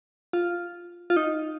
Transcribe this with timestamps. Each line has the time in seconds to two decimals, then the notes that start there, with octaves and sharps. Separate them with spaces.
0.33 F4
1.10 F4
1.16 D#4